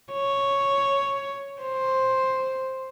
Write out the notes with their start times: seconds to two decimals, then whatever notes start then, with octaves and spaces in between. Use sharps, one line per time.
0.13 C#5
1.62 C5